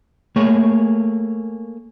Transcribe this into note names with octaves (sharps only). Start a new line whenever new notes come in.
A3 A#3 G#4 C#5